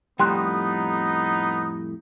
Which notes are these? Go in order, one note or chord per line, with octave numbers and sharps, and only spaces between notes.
F2 A2 G3 B3 D#4 G5 C6 F#6